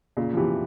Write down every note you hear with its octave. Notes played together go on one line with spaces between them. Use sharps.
A#2 C#3
F3
C3 E3